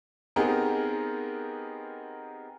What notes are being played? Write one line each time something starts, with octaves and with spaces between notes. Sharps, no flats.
B3 C4 D#4 G4 G#4 A#4